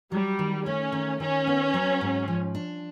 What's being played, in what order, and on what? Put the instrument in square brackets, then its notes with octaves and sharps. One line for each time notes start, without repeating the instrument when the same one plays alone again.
[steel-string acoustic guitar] F#3 [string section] G3
[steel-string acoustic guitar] D#3
[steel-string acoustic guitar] A3 [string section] C#4
[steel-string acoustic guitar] D#3
[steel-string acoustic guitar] D#3 [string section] C#4
[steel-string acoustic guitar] B3
F#3
G#2
F3
D4